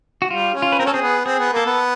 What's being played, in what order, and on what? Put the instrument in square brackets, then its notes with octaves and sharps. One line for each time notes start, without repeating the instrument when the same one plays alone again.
[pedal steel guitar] F#4
[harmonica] G3 [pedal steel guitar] F4
[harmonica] C#4
[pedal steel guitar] F4
B4
[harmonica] C4 [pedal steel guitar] A#4
[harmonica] C#4 [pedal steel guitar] A4
[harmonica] C4 [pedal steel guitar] G#4
[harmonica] B3
[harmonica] C4 [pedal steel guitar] G#4
[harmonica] B3
[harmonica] A#3 [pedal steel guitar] A4
[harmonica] B3